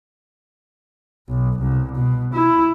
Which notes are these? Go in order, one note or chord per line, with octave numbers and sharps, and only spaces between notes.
B1
C2
B2
E4